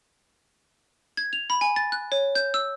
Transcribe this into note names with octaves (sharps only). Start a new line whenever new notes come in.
G#6
F7
B5
G#5
A6
F#6
C#5
G6
E6